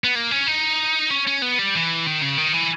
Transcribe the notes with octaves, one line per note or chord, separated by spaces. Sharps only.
B3
A#3
C#4
D#4
C#4
C#4
B3
G3
E3
D#3
C#3
D#3
E3